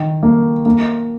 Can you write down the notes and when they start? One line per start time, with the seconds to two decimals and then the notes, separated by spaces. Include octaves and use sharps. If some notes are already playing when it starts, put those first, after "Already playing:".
Already playing: D#3
0.23 A#3
0.66 A#3